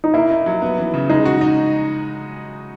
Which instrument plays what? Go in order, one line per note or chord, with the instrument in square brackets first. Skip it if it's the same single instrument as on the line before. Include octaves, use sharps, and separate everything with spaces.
[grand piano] D#4
[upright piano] A#3 [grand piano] E4
[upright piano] D#4
F#3
B3
E3
C#3
[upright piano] G#3 [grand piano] D#4
[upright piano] F#4
D#4